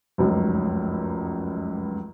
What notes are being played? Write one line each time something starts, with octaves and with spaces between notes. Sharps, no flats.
F1 C#2 F#2